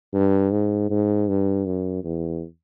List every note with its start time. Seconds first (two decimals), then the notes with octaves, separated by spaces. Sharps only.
0.13 G2
0.52 G#2
0.90 G#2
1.28 G2
1.66 F#2
2.04 E2